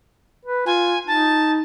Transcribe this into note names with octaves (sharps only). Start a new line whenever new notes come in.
B4
F4 G#5
D#4 A5